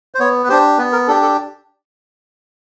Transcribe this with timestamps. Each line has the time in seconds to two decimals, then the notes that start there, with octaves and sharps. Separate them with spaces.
0.15 C5
0.19 B3 C#5
0.44 B4
0.49 D4 G4 C5
0.78 B3 B4
0.93 A#4
1.07 D4 G4 A4
1.22 A4